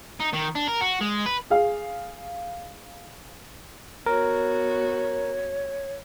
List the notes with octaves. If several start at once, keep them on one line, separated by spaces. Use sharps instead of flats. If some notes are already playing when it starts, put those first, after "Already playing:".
D#4
D#3
D4
A#4
F#4
G#3
B4
G#4 F5
B3 F#4 A#4 C#5